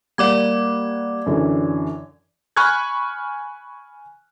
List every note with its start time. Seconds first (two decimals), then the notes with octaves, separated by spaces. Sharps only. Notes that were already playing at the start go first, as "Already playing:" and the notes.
0.18 G3 A#3 D5 F#5 D6 G#6
1.26 F#2 D3 E3
2.56 G#5 B5 C#6 F6 F#6 G#6